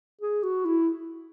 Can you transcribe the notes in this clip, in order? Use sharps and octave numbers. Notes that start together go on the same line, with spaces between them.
G#4
F#4
E4